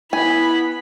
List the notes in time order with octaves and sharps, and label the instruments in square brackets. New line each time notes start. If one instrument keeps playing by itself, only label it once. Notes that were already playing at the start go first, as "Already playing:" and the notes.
[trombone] B3 [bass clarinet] E4 [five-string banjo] G#5 [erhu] B5